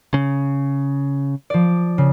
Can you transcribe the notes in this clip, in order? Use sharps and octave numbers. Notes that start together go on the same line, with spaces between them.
C#3
F3 D5
C#3